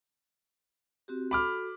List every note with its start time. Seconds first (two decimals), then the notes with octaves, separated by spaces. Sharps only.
1.08 C4 F#4 G4
1.31 F#4 A4 B5 D6 F6